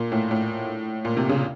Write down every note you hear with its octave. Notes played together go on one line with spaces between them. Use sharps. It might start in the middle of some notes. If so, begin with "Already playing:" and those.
Already playing: A#2
A2
A2
A#2
C3
C#3